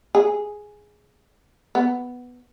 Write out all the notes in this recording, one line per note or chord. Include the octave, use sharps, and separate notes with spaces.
G#4
B3